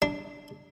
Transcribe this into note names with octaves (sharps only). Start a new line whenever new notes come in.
D4